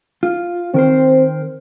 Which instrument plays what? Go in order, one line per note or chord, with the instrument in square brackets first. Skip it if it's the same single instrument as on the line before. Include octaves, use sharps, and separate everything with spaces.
[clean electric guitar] F4
[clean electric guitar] D#3 A#4 C5 [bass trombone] C4